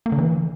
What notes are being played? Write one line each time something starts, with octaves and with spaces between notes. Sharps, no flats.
A#3
D3
E3